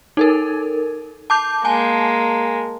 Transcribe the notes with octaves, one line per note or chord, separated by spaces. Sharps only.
D#4 A4 A#4
A5 D6 G6
G#3 A#3 G#5 A5